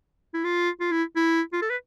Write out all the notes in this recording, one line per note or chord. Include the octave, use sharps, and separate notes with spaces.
E4
F4
F4
E4
E4
F4
A4
B4